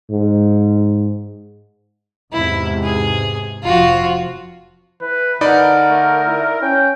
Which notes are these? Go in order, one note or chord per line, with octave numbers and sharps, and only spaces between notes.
G#2
E2 G#2 C3 E4
G#4
F1 F3 F4 F#4
E3 B4
D3 D#4 A#4 D5 B5
A3
E4
C#4 G5